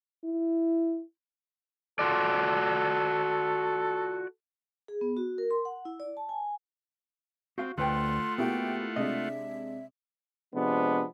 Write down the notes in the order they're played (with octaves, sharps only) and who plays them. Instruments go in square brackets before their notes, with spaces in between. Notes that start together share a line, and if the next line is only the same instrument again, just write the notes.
[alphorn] E4
[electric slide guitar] F4 F#4 D5 [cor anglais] A4
[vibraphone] G#4
B3
F#4
A#4
C6
F#5
E4
D5
A5
G#5
[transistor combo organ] C4 [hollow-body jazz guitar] F#4 F5
[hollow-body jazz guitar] D2 B4 G5 [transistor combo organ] A3 F4 F#5 [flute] C6
[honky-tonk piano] A#3 E4 G4 [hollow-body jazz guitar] B3 F#4 [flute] G5
[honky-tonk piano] C3 G#3 D4 [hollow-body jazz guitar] D#5 [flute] E5
[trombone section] C3 F3 G#3 B3 D4